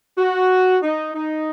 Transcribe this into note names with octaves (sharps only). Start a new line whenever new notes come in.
F#4
D#4
D#4